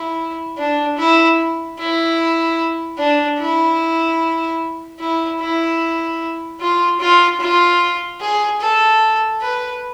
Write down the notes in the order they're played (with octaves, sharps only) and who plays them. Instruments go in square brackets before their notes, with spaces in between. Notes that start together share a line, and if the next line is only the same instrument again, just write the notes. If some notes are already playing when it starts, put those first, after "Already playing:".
Already playing: [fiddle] E4
D4
E4
E4
D4
E4
E4
E4
F4
F4
F4
G#4
A4
B4